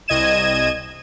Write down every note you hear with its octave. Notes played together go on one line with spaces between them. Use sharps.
C2 D#5 G#6 D#7 E7